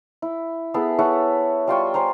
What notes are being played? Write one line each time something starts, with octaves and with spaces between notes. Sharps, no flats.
E4
B3 E4 G#4 A4
E4 A4 C#5 F#5
G3 F4 G5 C#6
C5 G#5 A#5